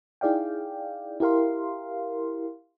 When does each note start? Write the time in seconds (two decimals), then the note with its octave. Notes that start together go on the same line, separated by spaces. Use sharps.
0.21 D#4 E4 G#4 D5 F5 G5
1.20 E4 G4 A#4 F5 C6